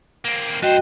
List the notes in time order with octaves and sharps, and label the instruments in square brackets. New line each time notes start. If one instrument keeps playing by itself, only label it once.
[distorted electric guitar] A#3 C4
[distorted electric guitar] G2 C5 [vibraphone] F#4 D#5 G5